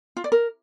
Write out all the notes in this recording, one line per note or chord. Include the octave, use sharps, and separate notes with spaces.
F4
D5
A#4